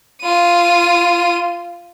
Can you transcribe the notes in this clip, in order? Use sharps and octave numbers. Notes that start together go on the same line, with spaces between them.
F4 D#7